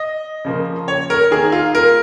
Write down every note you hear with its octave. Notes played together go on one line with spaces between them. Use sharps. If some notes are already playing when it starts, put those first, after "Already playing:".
Already playing: D#5
C#3 F3 A#3
C#5
A#4
D#3 A#3 G#4
F4
A#4